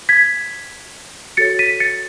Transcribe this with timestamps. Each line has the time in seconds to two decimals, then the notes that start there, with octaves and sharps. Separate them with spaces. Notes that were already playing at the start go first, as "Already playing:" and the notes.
0.09 G#6 B6
1.37 F#4 A4 C#5 A6 C#7
1.59 B6 D#7
1.80 A6 C#7